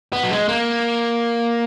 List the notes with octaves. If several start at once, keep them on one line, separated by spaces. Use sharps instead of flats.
B3
F#3
G#3
A#3